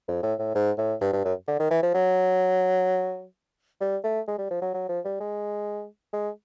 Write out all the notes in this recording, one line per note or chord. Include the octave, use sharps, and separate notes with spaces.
F2
A2
A2
G#2
A2
G2
G2
F#2
D3
D#3
E3
F3
F#3
G3
A3
G#3
G3
F3
F#3
F#3
F3
G3
G#3
G#3